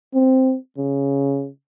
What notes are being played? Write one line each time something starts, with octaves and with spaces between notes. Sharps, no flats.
C4
C#3